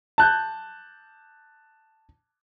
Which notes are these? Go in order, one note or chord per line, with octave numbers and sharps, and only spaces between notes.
A5 F#6 G6